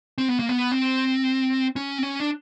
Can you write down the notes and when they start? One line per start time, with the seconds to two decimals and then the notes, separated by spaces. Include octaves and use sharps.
0.18 C4
0.28 B3
0.39 A#3
0.49 B3
0.72 C4
1.76 C#4
1.98 C4
2.03 C#4
2.20 D4